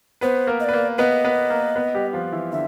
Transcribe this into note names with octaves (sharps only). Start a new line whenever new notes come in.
B3 B4 C5
A#3 A#4
D#5
B4 D5
A#3 A#4
B3 B4 D#5
B3 B4
A#3 A#4
B3 B4
G3 G4
F3 F4
E3 E4
D3 E5